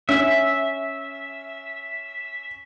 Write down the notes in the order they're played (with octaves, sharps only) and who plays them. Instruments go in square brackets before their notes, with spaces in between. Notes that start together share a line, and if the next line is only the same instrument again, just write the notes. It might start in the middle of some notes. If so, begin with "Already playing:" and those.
[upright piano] C#4 [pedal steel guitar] E5